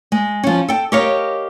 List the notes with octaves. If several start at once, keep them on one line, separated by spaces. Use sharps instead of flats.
G#3
F3 C#4
A4 G5
G4 A#4 C#5 D#5 F5